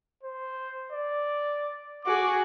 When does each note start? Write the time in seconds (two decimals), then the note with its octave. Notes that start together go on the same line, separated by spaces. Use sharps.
0.23 C5
0.92 D5
2.05 F#4 G#4 D6